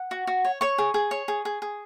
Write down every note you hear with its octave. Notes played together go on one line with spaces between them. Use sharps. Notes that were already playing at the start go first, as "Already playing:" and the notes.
Already playing: F#5
F#4
F#4
C#5
C#5 C#6
G#4
G#4
C#5
G#4
G#4
G#4